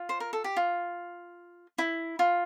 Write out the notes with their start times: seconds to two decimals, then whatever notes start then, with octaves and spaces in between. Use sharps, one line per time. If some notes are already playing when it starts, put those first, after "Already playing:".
Already playing: F4
0.09 C5
0.20 A#4
0.33 A4
0.44 G4
0.57 F4
1.78 E4
2.19 F4